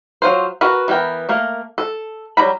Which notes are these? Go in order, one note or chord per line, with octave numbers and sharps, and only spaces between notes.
F#3 F4 C5
F#4 A#4 B4
E3 B3 A#4 G5
A3 A#3 A#4
A4
F#3 G3 A#5 B5